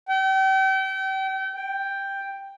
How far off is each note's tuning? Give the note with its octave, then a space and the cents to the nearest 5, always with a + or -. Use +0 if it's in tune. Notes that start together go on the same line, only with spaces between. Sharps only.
G5 -35
G5 +5